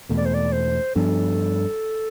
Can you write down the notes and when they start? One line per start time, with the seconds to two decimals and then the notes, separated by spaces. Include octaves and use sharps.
0.09 E2 B2 A3
0.17 D5
0.25 C5
0.34 D5
0.52 C5
0.95 G2 F3 B3 D4 A4